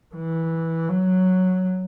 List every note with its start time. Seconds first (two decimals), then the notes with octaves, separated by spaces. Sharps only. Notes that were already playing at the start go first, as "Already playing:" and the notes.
0.15 E3
0.89 F#3